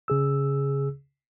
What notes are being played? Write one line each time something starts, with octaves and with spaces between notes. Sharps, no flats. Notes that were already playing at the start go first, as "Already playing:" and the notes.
C#3 G#4 E6